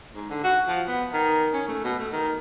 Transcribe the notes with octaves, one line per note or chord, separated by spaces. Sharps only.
G#2
D3
F#4
F3
B3
D#3
C#4
A3
B2
A3
D#3